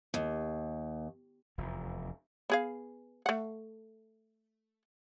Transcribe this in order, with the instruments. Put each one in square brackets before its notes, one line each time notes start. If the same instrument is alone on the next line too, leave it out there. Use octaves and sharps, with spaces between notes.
[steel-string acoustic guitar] D#2
[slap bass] F1 E2
[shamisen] B3 G#4 F5
A3 F#5